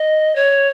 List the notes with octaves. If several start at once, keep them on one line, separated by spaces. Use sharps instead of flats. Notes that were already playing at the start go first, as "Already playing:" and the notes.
Already playing: D#5
C#5